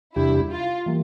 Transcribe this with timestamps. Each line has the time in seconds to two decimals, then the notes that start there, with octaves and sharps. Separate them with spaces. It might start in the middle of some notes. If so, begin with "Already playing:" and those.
0.16 E2 C3 G3 D4 E4 G4
0.52 F4
0.86 E3 G3 A#3